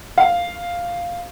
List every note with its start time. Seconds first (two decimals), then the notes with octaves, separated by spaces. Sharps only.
0.18 F5